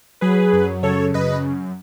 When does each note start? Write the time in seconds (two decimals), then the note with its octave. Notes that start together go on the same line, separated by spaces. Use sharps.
0.21 F#3 G#4 B4
0.53 F#2
0.83 C#3 A4 C#5
1.14 F#2 B4 D#5